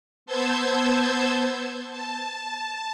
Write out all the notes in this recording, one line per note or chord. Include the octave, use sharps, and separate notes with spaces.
B3 C5 A5 E6 G6 G#6
A5